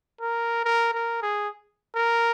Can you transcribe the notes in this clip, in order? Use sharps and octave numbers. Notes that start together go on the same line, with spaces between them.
A#4
A#4
A#4
G#4
A#4